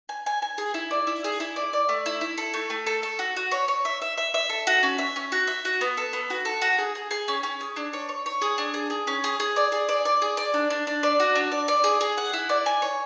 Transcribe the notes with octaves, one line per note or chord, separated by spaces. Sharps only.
G#5
G#5
G#5
G#4
E4
D5
E4
G#4
E4
D5
D5
A3
E4
E4
A4
A3
A3
A4
A4
F#4
F#4
C#5
C#5
E5
E5
E5
E5
A4
F#4
C#4
E5
C#4
F#4
E5
F#4
B3
A4
B3
F#4
A4
F#4
G#4
G#4
G#4
C#4
C#4
G#4
D4
C#5
C#5
C#5
G#4
D4
G#4
G#4
C#4
G#4
G#4
D5
G#4
D5
D5
G#4
D5
D4
D4
D4
D5
F#4
D4
D5
D5
G#4
G#4
F#5
E4
D5
G#5
C#5